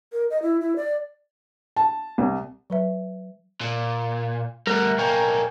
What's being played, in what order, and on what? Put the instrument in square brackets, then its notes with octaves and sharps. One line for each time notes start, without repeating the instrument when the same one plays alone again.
[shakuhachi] A#4
D#5
E4
E4
D5
[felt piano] A5
C2
[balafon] F#3 B4 E5
[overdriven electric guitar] A#2
[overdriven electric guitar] G3 A3 [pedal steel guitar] A#4 F#5
[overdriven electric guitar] B1 A#3 [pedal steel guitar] G5 G#5 C#6